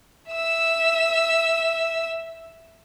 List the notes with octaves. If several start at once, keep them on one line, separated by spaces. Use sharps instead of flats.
E5 E6